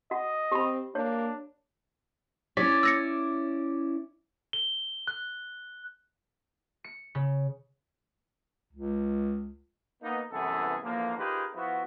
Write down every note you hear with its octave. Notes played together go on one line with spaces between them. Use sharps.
F#4 D#5 F#5
C4 G4 B5
A#3 D4 C#5
C#4 E4 C#5 D5 B6
E6 A#6 C#7
G7
F#6
C#7
C#3
C#2
A#3 B3 D#4
C2 F#2 E3 B3 G#4 A4
E2 D3 F3 A#3
D#4 F4 G4 G#4 A#4 B4
F3 B3 E4 F#4